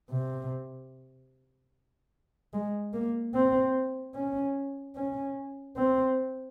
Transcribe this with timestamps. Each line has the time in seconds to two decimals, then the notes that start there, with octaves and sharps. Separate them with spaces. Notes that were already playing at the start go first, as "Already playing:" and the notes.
0.11 C3
2.53 G#3
2.94 A#3
3.34 C4
4.15 C#4
4.95 C#4
5.77 C4